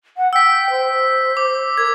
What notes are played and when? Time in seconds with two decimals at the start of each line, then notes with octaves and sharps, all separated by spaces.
0.17 F#5
0.33 G5 E6 B6
0.70 C5
1.37 D6
1.77 A#4 G#6